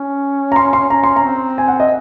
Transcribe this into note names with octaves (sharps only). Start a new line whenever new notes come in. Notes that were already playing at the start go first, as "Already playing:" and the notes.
Already playing: C#4
A#5
C6
C6
C#4 A#5
C6
A#5
C4
G#5
F#5
D#5